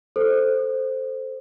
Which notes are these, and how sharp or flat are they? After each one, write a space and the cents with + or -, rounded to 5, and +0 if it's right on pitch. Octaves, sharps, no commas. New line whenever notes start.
A4 +0 C5 +0